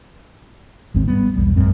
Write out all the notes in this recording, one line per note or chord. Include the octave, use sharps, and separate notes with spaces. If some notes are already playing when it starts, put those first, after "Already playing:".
G#1 D#2 G#2 C4
G3 B3
B1 E2 G3
A#1 F#2 G#3 C4